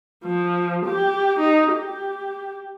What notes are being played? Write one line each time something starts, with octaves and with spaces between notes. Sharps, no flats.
F3
G4
D#4
G4